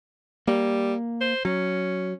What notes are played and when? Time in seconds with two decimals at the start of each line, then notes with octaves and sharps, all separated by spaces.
0.47 G3 A#3
1.21 C5
1.45 F#3 C#4